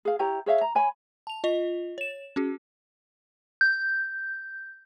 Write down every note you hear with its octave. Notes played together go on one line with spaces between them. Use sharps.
G#4 F5
E4 G4 C#5 A#5
G#4 C#5 E5 F5
A#5
C#5 G#5 B5
A5 F7
F4 D#5 F7
C#5 E7
C#4 F#4 G#4
G6